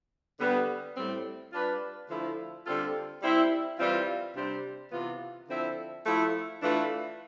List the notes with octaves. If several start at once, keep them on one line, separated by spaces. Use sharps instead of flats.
D3 G3 B3
A2 G3 C4
G3 D4 F4 B4
D3 F3 A3 E4
D3 G3 C4 F4 A4
G3 C4 E4
E3 G3 C4 F4
C3 G3 D4 G4 C5
C3 E3 B3 F4
D3 F3 C4 E4 A4
F3 A3 E4
E3 A3 D4 F4 B4